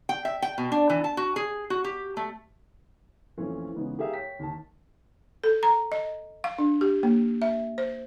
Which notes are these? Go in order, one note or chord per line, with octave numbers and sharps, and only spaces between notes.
G5
E5
G5
B2
D4
E3
A5
F#4
G#4
F#4
G4
A3
F2 A#2 E3 A3 C#4 F4
C#3 E3 G#3 B3 C#4 D#4
G4 G#4 A#4 E5 F5
C#5 G5 B6
D#2 A5
A4
A#5
D#5
F5
D4
G4
A#3
E5
C5